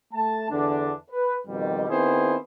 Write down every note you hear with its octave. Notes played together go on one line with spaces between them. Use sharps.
A3 A5
E2 D3 D4
B4
F2 B2 D#3 G3
D#3 B3 C4 E4 G#4 C5